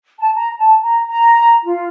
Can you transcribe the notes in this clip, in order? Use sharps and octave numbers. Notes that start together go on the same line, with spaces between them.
A5
A#5
A5
A#5
A#5
F4